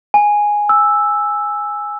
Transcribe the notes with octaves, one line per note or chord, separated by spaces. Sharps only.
G#5
E6